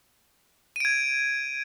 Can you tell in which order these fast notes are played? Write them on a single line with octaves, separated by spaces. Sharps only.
D#7 D7 G#6